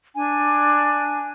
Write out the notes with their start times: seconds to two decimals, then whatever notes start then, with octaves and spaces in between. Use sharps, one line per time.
0.15 D4 G#5